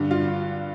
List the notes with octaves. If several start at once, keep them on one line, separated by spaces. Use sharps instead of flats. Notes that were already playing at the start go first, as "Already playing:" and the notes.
Already playing: G2 D3
F4